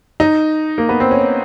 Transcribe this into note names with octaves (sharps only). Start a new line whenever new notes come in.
D#4
A#3
B3
C4
C#4